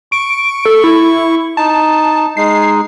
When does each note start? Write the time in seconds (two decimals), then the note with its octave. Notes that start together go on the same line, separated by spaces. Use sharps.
0.12 C#6 D7
0.65 A4
0.84 E4
1.57 D#4 A5
2.37 G#3 D#4 C7